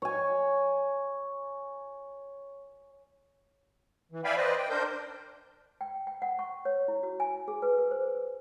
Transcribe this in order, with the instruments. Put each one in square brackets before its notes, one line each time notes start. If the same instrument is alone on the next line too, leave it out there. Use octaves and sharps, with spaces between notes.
[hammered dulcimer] C#5 G#5
[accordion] E3
D5 E5 F5 G5 G#5 B5
B4 C5 D5 D#5
G5
D4 A#4 C5 G6
[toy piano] G5
G5
F#5
C#6
C#5
E4
F#4
G#5
G#4
B4
A#4
C5